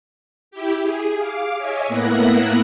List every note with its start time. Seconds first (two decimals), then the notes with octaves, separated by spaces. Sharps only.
0.51 E4 G4
0.82 G#4
1.18 F5 D6
1.58 C#5 D#5 E5 G#5
1.88 A2 A#3 B3 E4 F#6 A#6